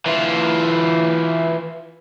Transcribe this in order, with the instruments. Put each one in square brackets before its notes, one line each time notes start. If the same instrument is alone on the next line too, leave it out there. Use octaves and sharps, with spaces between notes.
[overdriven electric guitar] E3 F4